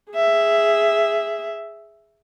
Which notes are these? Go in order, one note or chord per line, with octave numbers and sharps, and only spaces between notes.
G#4 E5